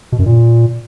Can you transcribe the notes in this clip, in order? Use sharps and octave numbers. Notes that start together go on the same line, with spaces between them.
B2
F#2
A#2